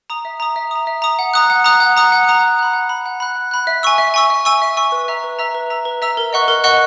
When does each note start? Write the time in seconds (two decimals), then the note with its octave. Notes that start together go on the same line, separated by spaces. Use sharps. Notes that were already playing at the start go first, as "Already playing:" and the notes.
0.10 A#5 D#6
0.25 E5
0.40 A#5 D#6
0.56 E5
0.71 A#5 D#6
0.87 E5
1.02 A#5 D#6
1.19 F#5
1.34 A#5 D#6 F#6
1.50 F#5
1.64 A#5 D#6 F#6
1.80 F#5
1.97 A#5 D#6 F#6
2.12 F#5
2.28 A#5 D#6 F#6
2.43 F#5
2.59 B5 F#6
2.73 F#5
2.89 B5 F#6
3.06 F#5
3.20 B5 F#6
3.36 F#5
3.51 B5 F#6
3.67 E5
3.83 G#5 C#6 E6
3.98 E5
4.14 G#5 C#6 E6
4.30 E5
4.45 G#5 C#6 E6
4.62 E5
4.77 G#5 C#6 E6
4.92 B4
5.08 E5 A#5 E6
5.24 B4
5.39 E5 A#5 E6
5.55 B4
5.70 E5 A#5 E6
5.85 B4
6.02 E5 A#5 E6
6.17 A#4
6.33 D#5 F#5 C#6 F#6
6.48 A#4
6.64 D#5 F#5 C#6 F#6